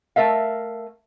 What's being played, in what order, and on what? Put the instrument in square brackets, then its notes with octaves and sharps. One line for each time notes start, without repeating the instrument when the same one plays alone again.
[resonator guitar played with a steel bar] A3 A#4 E5 F5